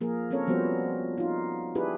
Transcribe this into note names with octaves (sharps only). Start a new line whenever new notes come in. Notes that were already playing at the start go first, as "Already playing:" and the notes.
F3 A#3 G#4 A#4
C4 C#4 A4 A#4 C#5
F3 G3 B3 F#4 C5
D#4 F4
D4 E4 G4 G#4 B4